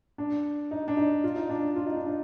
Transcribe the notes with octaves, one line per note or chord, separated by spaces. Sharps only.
D4
D#4
D4
D#4
F4
D#4
D4
F4
D#4
D4
D#4